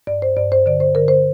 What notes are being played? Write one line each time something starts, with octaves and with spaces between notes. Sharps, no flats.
G2 D5
C5
G2 D5
C5
D3 D5
C5
D3 A#4
C5